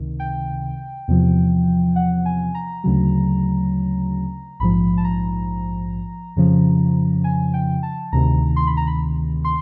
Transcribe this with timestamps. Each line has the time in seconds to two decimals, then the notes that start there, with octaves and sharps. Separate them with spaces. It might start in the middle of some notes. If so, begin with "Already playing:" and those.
Already playing: C#2 C3 D#3
0.20 G5
1.08 E2 C3 F3
1.96 F#5
2.26 G#5
2.55 A#5
2.84 D2 C#3 F#3
4.60 A#1 G#2 F3 B5
4.97 A5
5.04 A#5
6.36 F2 C#3 F3
7.24 G#5
7.54 G5
7.83 A5
8.12 D2 C3 D#3 A#5
8.56 C6
8.67 B5
8.77 A#5
8.87 B5
9.45 C6